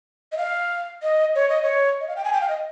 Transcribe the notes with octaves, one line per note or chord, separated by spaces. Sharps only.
D#5
F5
D#5
C#5
D#5
C#5
D#5
F5
G5
G#5
G5
F5
D#5